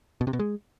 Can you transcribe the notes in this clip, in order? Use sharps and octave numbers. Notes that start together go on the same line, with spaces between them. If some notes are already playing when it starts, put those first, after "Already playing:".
B2
C3
B2
G#3